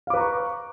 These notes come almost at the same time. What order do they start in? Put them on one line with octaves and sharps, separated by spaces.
F5 D6 B4 A#5 C#6